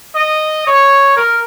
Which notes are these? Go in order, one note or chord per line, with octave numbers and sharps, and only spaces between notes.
D#5
C#5
A#4